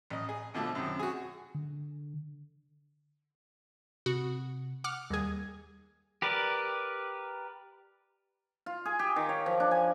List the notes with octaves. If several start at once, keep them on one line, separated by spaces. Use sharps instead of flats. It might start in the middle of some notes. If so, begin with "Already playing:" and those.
A1 D#5
G#4
B1 B2 D3 F3 A3
F#2 C3 D#3
F#4 G#4
D3
C3 F#4
F#5 D6 F6
D#2 G3 G#4 G#6
G4 A#4 B4 D5
F4
G#4
G4
D#3
C#5
F3
D4
G#5